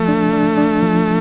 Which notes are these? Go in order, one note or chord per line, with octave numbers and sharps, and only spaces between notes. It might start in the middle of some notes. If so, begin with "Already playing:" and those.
Already playing: F3 A3
D4
D4
D4
F3